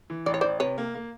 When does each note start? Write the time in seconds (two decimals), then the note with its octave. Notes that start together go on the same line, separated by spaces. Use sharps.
0.10 E3
0.26 A1 D5
0.34 C#5
0.41 A1 C5 D5
0.60 C3 B4 C#5
0.78 A#3
0.95 A#3